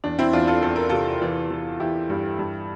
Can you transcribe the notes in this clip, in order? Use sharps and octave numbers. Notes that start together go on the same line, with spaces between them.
E2 D4
C4 E4
E2 D4 F4
F4 A4
E2 A4
A#4
C3 F4 A4
E3
E3
E3 E4 G4
G2
G2